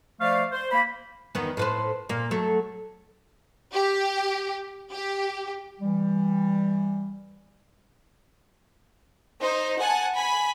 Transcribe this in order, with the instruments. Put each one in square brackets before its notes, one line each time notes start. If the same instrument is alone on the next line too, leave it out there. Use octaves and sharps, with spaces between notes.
[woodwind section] F3 A3 D5 F5
C5
A#3 B5
[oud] E2 D#3 B3
A2 B4 C5
A#2 A#3
F#3 A3
[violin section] G4
G4
[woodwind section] E3 G3
[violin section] D#4 C5
F#5 G#5 A5
G#5 B5